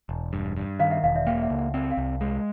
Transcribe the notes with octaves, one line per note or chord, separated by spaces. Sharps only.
E1
G2
G2
D#3 D#5 F5
E5 F#5
E1 D#5 F5
D5 E5
A#3 F5 G5
E5 F#5
C#2
E5 F#5
C4 G5
F5 G5
C2
G#3